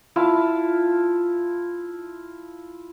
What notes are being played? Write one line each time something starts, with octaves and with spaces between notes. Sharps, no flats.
E4 F4 F5 A5